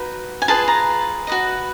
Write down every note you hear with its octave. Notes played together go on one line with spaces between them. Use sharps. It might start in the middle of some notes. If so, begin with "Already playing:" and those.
Already playing: D#4 F#4 B4
G#5
F4 G#4 B4 A5
A#5
F#4 B4 D#5